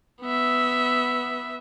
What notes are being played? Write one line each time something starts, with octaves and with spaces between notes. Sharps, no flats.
B3 E5